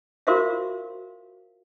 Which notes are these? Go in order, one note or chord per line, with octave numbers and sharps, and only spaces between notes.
F4 F#4 A#4 C5 E5 F5